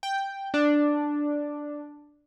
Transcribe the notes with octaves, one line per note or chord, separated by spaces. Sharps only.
G5
D4